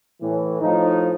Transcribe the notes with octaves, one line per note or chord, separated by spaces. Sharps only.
A2 E3
A2 F3 D#4